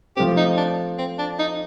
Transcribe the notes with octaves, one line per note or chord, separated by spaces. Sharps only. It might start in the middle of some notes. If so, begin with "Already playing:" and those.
F3 A3 C4 G4
D#4
D4
C4
D4
D#4